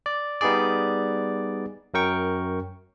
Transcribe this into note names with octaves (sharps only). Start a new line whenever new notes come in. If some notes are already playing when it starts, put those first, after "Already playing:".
D5
G3 B3 D#4 G#4 D5
F#2 F#3 A#4 G5 C#6